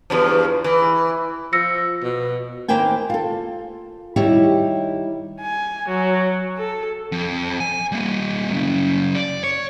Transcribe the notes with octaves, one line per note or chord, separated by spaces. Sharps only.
E2 G2 F3
E3
F3 E6 A#6 C#7
B2
D#3 A#3 B4 C5 G5 G#5
F4 A4
D#3 G3 E4 F#4 G4 C#5
G#5
F#3
A4
F2
G#5
G3 A#3
F#2 C#3
D5
C#5